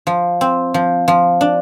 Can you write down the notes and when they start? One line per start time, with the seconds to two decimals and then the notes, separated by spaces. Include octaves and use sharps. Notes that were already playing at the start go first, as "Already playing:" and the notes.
0.07 F3
0.41 C4
0.74 F3
1.08 F3
1.41 D4